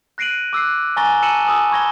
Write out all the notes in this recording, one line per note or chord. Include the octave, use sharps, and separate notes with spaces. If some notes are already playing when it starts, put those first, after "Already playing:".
F#6 A#6 C7 D7 D#7 F#7
D6 E6 F#6 C7
G#5 A#5 C#6 A6 A#6 G7
A5 E6 C#7 D#7 E7 F#7
G#5 D#6 E6
B5 C#6 G#6 A#6 G7